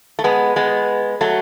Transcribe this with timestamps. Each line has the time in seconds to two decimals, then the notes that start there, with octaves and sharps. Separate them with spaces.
0.19 A3
0.24 G#3 B3
0.56 G#3 B3
1.21 F#3 A3